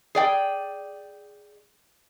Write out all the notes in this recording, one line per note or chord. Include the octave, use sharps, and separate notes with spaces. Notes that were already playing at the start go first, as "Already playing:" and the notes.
G#4 D5 G5